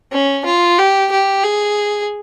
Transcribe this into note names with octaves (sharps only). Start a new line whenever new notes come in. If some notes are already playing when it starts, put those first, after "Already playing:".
C#4
F4
G4
G4
G#4